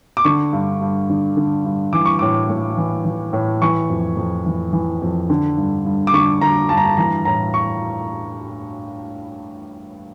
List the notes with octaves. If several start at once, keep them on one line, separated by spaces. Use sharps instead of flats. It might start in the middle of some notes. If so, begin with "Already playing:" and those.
D6
D3 C#6
G2
G2
D3
D3
G2
E3 D6
C#6
A2 D6
A2
E3
E3
A2
E3 C#6
F2
F2
E3
E3
F2
D3
G2
G2
D6
D3 C#6
D3 A#5
G2 A5
A#5
A5
E3 A#5
A2 A#5
C#6